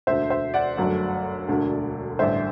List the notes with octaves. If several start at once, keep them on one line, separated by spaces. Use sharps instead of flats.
E1 D2 D3 C5 E5
C5 E5
D5 F#5
G1 F#2 F#3 A3
E1 D2 D3 A3
A1 G2 D3 C5 E5